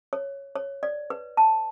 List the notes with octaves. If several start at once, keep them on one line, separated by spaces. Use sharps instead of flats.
C#5
C#5
D5
B4
A5